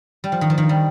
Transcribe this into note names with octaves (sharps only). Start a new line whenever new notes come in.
G3
F3
D#3
F3
D#3
G3